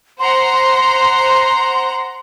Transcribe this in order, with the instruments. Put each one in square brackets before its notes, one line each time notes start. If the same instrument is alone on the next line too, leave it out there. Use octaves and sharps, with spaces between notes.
[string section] C5 F#5 A#5 [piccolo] C6